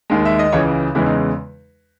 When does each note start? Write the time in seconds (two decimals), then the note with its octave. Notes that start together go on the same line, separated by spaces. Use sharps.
0.10 D#2 D#3 G#3
0.25 E5
0.39 D#5
0.52 C#2 C#3 E3 C#5
0.95 E2 C#3 E3 G#3 E4
1.06 D#4